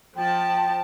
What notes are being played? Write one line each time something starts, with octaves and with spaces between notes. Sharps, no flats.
F3 G5 A5